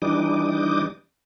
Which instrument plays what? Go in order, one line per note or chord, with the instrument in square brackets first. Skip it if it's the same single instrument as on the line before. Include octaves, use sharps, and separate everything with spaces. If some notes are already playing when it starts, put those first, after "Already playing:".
[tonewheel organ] E3 G3 D4 D#4 D6 D#6